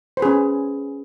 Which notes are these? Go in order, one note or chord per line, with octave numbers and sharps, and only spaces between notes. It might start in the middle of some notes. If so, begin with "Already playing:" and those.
C#4 G#4 B4 C5